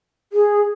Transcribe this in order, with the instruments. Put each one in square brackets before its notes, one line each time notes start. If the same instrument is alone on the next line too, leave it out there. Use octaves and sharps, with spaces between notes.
[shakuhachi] G#4